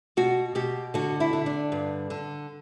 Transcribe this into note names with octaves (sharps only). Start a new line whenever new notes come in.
B2 F#4
B2 G4
D3 F#4
E4
D3
D4
G2
D3